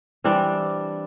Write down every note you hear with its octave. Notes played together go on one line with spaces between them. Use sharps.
E3 G3 C4 D4